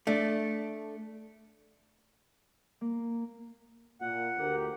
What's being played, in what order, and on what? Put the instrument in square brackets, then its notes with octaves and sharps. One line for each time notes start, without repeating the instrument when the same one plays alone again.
[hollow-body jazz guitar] A3 D4
[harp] A#3
[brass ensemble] A#2 [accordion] F#5
[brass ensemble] D2 G4 A#4